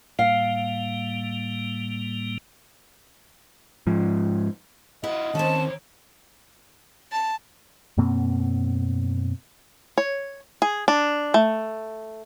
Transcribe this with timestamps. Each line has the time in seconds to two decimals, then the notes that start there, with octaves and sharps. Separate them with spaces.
0.19 A2 G3 A#3 F5
3.87 G#2 F3
5.04 E4 F4 D#5 F#5
5.35 D#2 C4 C#4 A5
7.11 A5
7.97 F#2 B2 A#3 C4
9.98 C#5
10.62 G#4
10.88 D4
11.34 A3